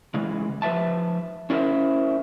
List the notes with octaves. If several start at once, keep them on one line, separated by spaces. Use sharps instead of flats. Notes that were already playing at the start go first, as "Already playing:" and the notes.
C#3 E3 G#3
F3 B4 D5 E5 A5
C#4 D4 E4 A#4 C5 E5